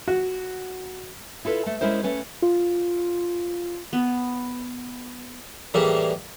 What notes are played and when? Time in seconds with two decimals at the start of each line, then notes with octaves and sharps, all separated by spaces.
0.08 F#4
1.45 E4 F4 A4 B4
1.66 A3
1.81 G#3 C#4 E4 A#4 C5
2.03 A3 C#4 B4
2.42 F4
3.93 B3
5.74 A2 E3 G3 A#3 G#4